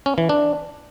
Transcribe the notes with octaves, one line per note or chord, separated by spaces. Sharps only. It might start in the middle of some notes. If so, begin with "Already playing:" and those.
C#4
E3
D4